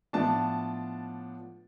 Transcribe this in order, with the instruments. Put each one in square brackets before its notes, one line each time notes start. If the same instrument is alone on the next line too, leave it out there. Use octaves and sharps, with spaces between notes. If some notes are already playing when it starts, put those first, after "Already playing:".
[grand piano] A2 F3 B3 D4 A5